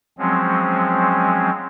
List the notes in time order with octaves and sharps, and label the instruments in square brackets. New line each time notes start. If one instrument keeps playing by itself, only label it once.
[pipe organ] F3 F#3 G#3 C4 C#4